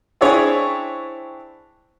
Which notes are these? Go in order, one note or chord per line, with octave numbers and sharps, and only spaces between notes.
C4 D4 E4 G#4 C#5